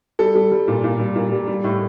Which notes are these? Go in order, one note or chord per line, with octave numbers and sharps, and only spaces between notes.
G3 A4
G3
G3
A#2
A#2
G3
A#2
G3
G3
A2